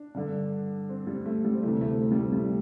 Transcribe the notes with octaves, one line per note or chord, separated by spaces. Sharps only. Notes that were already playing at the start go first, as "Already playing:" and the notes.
Already playing: D4
G2 D3
C4
G3
A3
G3
C4
D2 C3 E3 A3
A3
C4
G3
A3
G3
A3